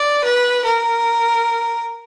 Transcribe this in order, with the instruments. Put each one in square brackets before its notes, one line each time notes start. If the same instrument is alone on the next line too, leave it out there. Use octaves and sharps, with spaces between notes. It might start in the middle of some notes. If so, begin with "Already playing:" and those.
Already playing: [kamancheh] D5
B4
A#4